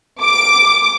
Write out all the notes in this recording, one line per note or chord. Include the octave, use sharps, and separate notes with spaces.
D6